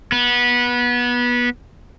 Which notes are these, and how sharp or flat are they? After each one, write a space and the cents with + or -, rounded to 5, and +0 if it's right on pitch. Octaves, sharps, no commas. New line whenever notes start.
B3 -20